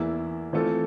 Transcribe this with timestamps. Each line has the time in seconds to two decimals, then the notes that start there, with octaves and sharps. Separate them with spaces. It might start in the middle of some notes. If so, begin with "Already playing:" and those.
Already playing: E2 E3 A#3 E4
0.53 E3 A3 C4 F4 A4